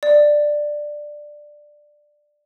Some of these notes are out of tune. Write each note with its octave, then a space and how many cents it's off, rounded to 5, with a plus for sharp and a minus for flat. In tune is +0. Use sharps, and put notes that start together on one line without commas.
D5 +10